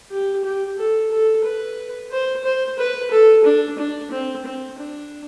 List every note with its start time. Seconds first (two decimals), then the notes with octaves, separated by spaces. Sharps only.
0.11 G4
0.44 G4
0.79 A4
1.12 A4
1.45 B4
2.12 C5
2.45 C5
2.79 B4
3.11 A4
3.45 D4
3.78 D4
4.11 C4
4.46 C4
4.78 D4